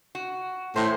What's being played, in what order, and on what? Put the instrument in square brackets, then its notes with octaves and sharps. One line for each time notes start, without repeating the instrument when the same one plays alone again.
[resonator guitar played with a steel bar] F#4
[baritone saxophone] A2 [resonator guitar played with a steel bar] E3 E4 C5